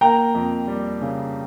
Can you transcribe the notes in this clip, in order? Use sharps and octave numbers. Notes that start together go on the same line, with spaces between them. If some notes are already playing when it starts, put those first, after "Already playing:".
A#3 G5 A#5
F2
G3
C#3